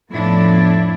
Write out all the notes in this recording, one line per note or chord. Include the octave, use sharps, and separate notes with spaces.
F2 A2 F3 B3 D4 E4